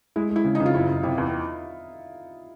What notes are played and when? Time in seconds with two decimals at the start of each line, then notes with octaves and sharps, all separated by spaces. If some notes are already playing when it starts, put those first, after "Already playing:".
0.16 G#3 E4
0.30 G#3
0.36 E4
0.45 C#3
0.55 D#4
0.60 C#3
0.66 F4
0.75 F#1 E4
0.88 F#1
1.03 C3 E4
1.18 E2